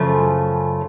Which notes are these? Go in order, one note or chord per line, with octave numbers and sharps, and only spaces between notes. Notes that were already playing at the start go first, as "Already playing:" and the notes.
Already playing: F#2 C#3 F3 A3